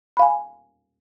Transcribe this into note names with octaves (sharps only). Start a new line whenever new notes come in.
F5 G#5 B5